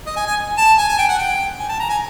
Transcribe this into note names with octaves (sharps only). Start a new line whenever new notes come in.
D#5
G#5
G#5
A5
G#5
G#5
G5
F#5
G5
G#5
A5
A#5
G#5